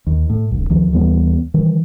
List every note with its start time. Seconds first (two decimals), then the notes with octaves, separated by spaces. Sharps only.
0.07 D#2
0.30 A2
0.51 D1 C2
0.70 D2 D#3 F3
0.92 D#2 E3 G3 B3
1.54 D#3 E3 G3